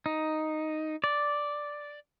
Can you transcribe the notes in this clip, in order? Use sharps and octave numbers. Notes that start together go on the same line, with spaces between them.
D#4
D5